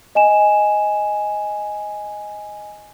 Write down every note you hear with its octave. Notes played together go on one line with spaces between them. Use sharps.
D#5 G#5 E7